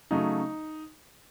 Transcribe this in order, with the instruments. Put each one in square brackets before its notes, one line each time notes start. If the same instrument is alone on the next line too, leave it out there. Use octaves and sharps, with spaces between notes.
[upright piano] C#3 F#3 A3 D#4